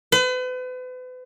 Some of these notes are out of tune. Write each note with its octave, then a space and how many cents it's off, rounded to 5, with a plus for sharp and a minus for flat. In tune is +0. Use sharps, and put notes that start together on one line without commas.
B4 +40